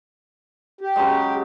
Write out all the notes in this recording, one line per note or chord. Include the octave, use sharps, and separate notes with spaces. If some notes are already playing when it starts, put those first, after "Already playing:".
G4
C#3 F#3 G#3